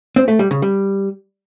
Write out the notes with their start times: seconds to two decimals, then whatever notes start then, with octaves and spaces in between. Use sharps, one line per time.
0.16 C4
0.28 A3
0.39 G3
0.51 C#3
0.62 G3